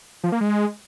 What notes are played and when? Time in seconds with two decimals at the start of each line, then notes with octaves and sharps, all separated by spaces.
0.24 F3
0.32 A#3
0.41 G#3